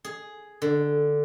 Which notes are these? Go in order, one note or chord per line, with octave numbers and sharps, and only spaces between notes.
G#4
D3